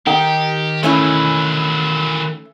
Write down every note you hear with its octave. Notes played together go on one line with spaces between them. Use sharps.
D#3 D#4 G4 G5
E3 F#3 A3 C#4 E4